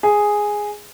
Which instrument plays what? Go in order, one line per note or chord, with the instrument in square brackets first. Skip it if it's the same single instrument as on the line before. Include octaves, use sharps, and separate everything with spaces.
[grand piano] G#4